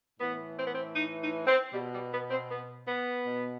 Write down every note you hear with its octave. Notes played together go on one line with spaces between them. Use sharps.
A2 E3 B3
C4
B3
C4
D#4
D#4
C4
B2 G3
G3
B3
C4
B3
B3
B2